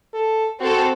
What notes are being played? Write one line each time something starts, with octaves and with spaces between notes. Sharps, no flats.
A4
C4 F#4 A4